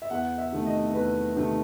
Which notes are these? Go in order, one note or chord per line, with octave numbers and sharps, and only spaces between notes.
E5
E2 F#5
E5
C3 D#3 A3
D#5
E2 B4
C3 D#3 A3